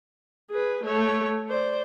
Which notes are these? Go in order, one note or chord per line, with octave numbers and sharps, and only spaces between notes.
G#4 B4
A3 C#5
C5 D5